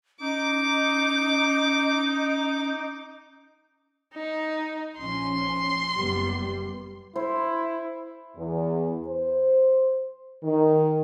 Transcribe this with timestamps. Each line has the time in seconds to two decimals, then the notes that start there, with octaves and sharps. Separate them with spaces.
0.21 C#4 D#4 D6
4.14 D#4
4.98 A#1 F3 C#4 C6
5.96 F#1 G3 B3
7.16 E4 C5
8.36 E2
9.08 C5
10.43 D#3